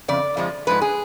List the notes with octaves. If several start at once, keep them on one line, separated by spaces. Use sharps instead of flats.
F2 C#3 D5
F2 F3 G#3
G#2 F3 G#3 B4
G#4